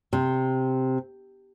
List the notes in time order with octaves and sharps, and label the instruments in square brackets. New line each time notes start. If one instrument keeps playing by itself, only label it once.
[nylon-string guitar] C3